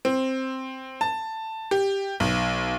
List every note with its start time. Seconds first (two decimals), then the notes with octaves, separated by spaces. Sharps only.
0.05 C4
1.01 A5
1.71 G4
2.20 B1